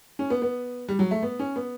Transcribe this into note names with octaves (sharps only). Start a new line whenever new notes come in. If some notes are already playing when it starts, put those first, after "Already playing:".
C#4
B3
B3
G3
F#3
A3
B3
C#4
B3